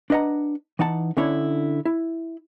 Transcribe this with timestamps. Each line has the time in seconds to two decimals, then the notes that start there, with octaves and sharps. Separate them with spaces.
0.10 D4 B4 D#5 F#5 A#5
0.79 E3 D#4 F#5 A5
1.17 D3 C#4 D4 E4 C#5
1.85 E4